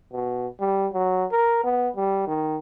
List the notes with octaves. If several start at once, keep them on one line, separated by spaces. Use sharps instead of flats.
B2
G3
F#3
A#4
B3
G3
D#3